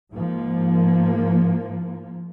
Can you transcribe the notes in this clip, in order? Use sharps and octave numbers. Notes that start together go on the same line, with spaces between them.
G#2 F3 A#3